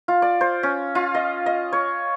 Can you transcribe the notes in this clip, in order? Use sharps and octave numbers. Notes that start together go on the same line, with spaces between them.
F4
D5
C5
C#4
F4
D#5
D#5
C#5